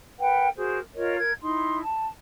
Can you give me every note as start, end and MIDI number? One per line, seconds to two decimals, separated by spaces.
0.19 0.48 70
0.19 0.48 71
0.19 0.48 78
0.19 0.48 79
0.56 0.79 66
0.56 0.79 68
0.56 0.79 70
0.56 0.79 72
0.94 1.16 65
0.94 1.16 70
0.94 1.16 73
0.94 1.16 75
1.18 1.32 70
1.18 1.32 92
1.41 1.80 63
1.41 1.80 64
1.41 1.80 84
1.82 2.06 81